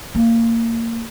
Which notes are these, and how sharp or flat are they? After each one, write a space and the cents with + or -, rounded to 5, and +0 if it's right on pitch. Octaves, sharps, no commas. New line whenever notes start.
A#3 -20